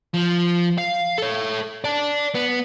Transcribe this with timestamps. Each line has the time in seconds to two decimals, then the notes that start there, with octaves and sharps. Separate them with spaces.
0.14 F3
0.78 F5
1.18 A4 C#5
1.84 D5 A5
2.35 B3